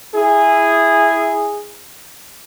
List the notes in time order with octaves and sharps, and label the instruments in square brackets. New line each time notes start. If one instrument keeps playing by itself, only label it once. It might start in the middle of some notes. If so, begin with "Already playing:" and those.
[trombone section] E4 G#4